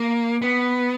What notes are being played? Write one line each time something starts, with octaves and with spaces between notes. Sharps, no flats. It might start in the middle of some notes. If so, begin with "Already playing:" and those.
Already playing: A#3
B3